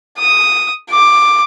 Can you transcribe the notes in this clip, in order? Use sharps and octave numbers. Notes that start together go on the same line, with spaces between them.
D#6
D6